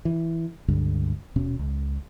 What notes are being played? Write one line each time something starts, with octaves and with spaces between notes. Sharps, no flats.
E3
C#2 G2 D3
D#1 B2 C#4
C#2